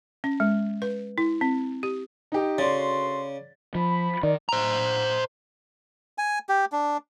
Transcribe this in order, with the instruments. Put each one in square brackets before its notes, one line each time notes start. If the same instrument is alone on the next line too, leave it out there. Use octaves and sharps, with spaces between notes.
[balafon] C#4
G#3
B4
E4
C4
G4
[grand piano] D#4 G4
[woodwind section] D2 F#4 C6 [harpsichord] C#3 [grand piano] D5 A6
[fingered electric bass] F3 [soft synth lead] B5
[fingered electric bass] D#3 [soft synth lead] D5
[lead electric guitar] C5 A#5
[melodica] G#5
G4
D4